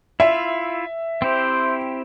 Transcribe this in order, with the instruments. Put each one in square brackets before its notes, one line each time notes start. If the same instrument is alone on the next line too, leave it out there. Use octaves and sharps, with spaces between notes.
[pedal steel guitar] E4 F4 [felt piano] E5
[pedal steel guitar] C4 E4 G4 [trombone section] C5